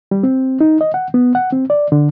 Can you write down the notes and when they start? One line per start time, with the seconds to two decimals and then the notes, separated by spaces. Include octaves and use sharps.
0.11 G3
0.23 C4
0.61 D#4
0.81 D#5
0.94 F#5
1.14 B3
1.35 F#5
1.52 C4
1.70 D5
1.92 D3